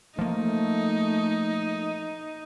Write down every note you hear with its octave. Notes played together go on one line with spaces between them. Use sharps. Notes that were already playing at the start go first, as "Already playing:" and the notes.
F3 A3 A#3 D#4